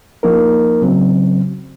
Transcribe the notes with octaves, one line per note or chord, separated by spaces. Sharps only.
F3 A#3 D#4 A#4
C#3 F#3 C4